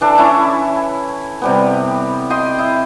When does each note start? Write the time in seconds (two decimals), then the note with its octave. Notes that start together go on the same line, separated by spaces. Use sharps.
0.01 E3 D4 A4
0.18 C#4 E4
1.42 C3 G3 B3
2.30 D#5 G5 C6
2.58 E4